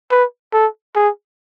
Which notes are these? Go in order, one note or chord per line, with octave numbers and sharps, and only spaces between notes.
B4
A4
G#4